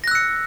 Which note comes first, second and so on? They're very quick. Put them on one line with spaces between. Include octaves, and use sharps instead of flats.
A#6 F#6 E6 C#7